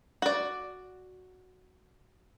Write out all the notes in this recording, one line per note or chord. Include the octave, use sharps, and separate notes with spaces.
F#4 D5